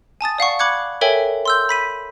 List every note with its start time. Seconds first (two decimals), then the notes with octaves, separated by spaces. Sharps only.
0.21 G#5 A5 D#6 A6
0.38 D5 F5 F#5 C#6
0.59 B5 D6 F#6 G#6 C#7
1.01 A4 A#4 C#5 E5 G5 G#5
1.46 C6 E6 G6
1.69 B5 B6 D#7